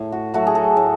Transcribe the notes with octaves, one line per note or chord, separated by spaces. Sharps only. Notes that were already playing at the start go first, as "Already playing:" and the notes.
Already playing: A2
F#4
F#3 A3 F#4
G#4
A4
A2